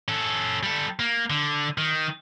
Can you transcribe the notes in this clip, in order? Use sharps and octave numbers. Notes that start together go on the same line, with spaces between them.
C#4 A4
G3 A4
A#3
D3
D#3